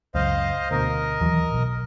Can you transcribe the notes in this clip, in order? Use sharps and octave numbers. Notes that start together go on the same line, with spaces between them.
C#2 F#2 C5 D#5 F5
D2 B2 A#4 D#5
D#2 E3 F#3
D#1 B1